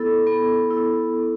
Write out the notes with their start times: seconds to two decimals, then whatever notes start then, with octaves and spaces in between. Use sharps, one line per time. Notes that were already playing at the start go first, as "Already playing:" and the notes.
Already playing: B3 E4 A4
0.27 B3
0.71 E4 A4
1.15 B3